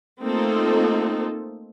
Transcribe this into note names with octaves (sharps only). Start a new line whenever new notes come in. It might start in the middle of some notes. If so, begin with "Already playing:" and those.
A3 A#3 C4 D#4 F4 A4